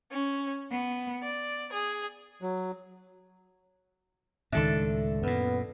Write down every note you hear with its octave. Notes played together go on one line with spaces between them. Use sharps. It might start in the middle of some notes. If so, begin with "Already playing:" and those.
C#4
B3
D5
G#4
F#3
C#2 A2 D#3 D4 A4 E5
F#2 A#2 B3